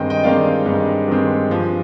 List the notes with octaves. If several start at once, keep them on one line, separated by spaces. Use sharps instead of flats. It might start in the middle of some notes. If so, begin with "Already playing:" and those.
Already playing: G2 D#3 G#3 C4 D#5 G5
D#5 G5
G2 D#3 G#3 C4 D5 F5
G2 D#3 G#3 C4
G2 D#3 G#3 C4
G2 F3 G#3